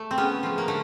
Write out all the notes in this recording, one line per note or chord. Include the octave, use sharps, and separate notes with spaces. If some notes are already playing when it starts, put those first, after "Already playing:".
Already playing: A3
C4
C#3 B3 C#4
F3 A3
A#3
D3 A3